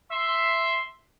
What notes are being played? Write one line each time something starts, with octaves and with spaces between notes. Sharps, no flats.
E5 C6